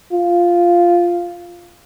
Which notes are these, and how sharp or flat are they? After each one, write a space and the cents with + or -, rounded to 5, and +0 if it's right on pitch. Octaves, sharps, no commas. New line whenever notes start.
F4 -5